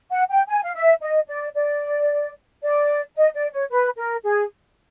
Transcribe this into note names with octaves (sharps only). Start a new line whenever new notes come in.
F#5
G5
G#5
F5
E5
D#5
D5
D5
D5
D#5
D5
C#5
B4
A#4
G#4